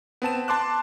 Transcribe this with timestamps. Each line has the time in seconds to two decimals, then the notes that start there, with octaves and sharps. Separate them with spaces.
0.22 B3 C4 A5 E7
0.48 A5 C6 D6 F#6